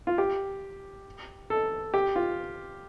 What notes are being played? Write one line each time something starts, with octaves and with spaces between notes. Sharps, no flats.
F4
G4
A4
G4
F4